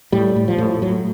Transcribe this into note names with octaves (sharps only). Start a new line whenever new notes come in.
A2 G3
A2
F3
A2
A2 F#3